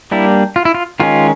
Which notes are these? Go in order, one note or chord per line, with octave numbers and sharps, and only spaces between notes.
G3 A#3 D4 E4
F4
E4
F4
D#3 G#3 C#4 F4